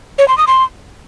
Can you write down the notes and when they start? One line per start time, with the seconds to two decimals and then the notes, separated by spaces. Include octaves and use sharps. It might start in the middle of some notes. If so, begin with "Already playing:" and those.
0.19 C#5
0.28 C6
0.38 D#6
0.47 C6